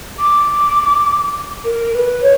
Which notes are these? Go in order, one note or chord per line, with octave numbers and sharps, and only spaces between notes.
D6
A#4
B4
C#5